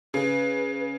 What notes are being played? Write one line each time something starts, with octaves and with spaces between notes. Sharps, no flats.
C#3 B4